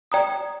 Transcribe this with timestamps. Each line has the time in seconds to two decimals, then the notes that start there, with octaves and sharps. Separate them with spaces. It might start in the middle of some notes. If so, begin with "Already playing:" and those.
0.12 D5 G5 A#5 D#6